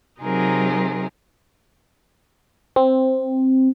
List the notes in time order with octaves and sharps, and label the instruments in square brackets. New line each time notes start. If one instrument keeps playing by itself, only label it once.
[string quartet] C3 F#3 C4 D#4 G#4 A#4
[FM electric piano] C4